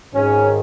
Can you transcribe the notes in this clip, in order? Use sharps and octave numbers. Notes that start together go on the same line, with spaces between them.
G#1 G#2 D#3 C#4